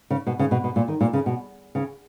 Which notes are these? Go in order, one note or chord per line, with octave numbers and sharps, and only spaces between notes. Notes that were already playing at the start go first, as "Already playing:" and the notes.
C#3
B2
C#3
B2
B2
A#2
D#3
A#2
C#3
B2
C#3